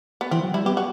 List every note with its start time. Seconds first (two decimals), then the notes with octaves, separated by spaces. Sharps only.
0.21 B3
0.31 E3 C4
0.43 F#3
0.54 G3 E4
0.65 B3 G4
0.77 F#4